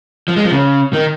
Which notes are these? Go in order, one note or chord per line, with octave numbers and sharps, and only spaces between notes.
F3
G#3
F3
C#3
D#3